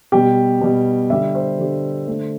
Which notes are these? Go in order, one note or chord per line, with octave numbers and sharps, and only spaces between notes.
B2 G3 G4
B2 G3
D3 G3 E5
C5
D3 G3
D3 A3